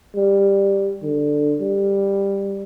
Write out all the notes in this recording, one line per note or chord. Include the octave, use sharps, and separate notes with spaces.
G3
D3
G3